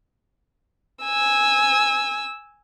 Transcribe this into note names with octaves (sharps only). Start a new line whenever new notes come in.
G#5 E6